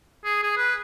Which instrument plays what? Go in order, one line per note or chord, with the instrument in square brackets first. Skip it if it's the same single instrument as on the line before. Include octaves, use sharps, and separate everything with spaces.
[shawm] G#4
G#4
B4